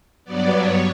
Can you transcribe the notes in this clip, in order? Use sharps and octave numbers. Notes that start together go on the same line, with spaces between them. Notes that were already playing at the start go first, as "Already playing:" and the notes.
G2 F#3 B3 D5
C#5